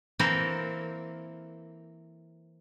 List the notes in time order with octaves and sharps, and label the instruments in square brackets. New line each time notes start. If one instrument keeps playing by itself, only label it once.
[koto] E3 A#3 C4 E4 A4 A#4